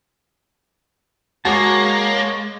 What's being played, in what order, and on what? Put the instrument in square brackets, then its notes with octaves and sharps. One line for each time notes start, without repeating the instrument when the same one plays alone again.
[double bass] G#3 [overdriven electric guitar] A#3 [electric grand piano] F#4 G#4 D6 [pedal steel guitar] C#5 A5